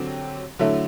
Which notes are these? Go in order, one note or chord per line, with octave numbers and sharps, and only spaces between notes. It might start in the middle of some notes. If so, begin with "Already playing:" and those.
Already playing: D3 F#3 C4 G4
D3 F#3 A3 E4